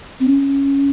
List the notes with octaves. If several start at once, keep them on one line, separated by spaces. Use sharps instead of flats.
C4
C#4